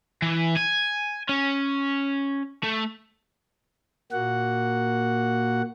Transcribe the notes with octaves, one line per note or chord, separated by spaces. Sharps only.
E3
G#5
C#4
A3
A#2 A#3 F#4 F#5